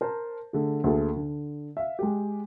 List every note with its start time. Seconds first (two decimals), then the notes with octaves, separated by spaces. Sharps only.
0.01 A#4 C5 A5
0.53 D3 A3 G#4
0.84 D2 A#3 G#4 A4
1.16 D3
1.77 E5 F5
1.99 G#3 G4